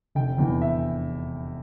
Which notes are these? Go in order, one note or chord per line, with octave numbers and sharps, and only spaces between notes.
F1 G5
E2 E3
E5